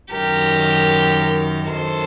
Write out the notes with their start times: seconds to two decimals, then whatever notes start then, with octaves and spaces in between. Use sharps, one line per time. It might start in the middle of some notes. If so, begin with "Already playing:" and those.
0.12 F#2 D#3 G4 A#4
1.70 F#2 D#3 A4 C5